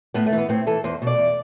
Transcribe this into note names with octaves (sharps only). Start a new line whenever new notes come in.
A2 B3
A3
E3
B3
A2 C4
E3 A4
E2 C5
B2 D5
E2